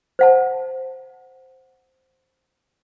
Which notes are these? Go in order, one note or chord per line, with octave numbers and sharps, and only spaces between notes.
C5 F#5 A5